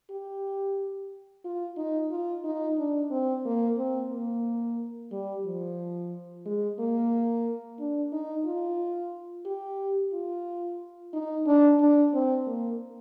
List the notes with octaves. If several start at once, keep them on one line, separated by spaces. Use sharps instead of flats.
G4
F4
D#4
F4
D#4
D4
C4
A#3
C4
A#3
G3
F3
G#3
A#3
D4
D#4
F4
G4
F4
D#4
D4
D4
C4
A#3